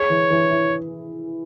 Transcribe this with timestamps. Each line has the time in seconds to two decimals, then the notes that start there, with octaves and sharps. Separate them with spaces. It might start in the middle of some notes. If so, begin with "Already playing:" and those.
Already playing: G#4 C#5
0.10 E3
0.30 E3
0.50 E4